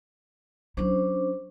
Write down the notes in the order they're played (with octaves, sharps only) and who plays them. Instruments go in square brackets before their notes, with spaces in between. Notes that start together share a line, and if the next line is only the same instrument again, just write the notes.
[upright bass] F#3 E4 [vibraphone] C#4 D4 C5